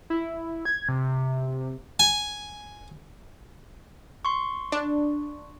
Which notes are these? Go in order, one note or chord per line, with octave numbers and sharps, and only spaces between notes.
E4
G#6
C3
G#5
C6 C#6
D4